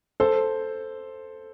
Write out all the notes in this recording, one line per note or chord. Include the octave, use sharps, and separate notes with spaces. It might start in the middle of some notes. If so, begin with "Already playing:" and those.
A4 C5